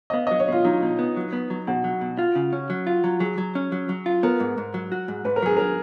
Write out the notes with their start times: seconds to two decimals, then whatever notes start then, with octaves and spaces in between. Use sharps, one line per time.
0.10 D#5
0.13 B3 F5
0.27 F#3 D#5
0.39 C#5
0.48 B2 F4
0.64 F#3 D#4
0.82 B2
0.99 B3
1.17 F#3
1.33 B3
1.50 F#3
1.67 B2 F#4
1.84 F#3
2.01 B2
2.19 F4
2.35 C#3
2.53 C#4
2.70 F#3
2.87 F4
3.04 F#3
3.20 F#3 G#4
3.38 F#3
3.55 C#4
3.72 F#3
3.89 F#3
4.06 F4
4.23 B3 A#4
4.40 G#2
4.58 G#2
4.74 F#3
4.92 F#4
5.08 G#2
5.25 G#2 B4
5.36 A#4
5.42 F#3 G#4
5.57 F#3 A#4